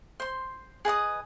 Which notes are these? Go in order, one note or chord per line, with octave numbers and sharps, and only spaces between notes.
C5 C6
G#4 B4 D#5 D#6